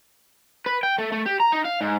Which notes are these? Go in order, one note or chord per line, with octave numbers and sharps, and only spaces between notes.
B4
G5
A3
A3
G4
A#5
D#4
F5
G#2